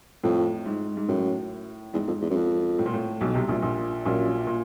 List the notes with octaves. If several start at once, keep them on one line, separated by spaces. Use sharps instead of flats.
F2 A2
G#2
G#2
F#2 A2
E2 G#2
F2
E2
F#2
F2
A2
A#2
A2
B1 B2
C2 C3
A#1 A#2
A#1 A#2
A#1 F#2 A#2
A#2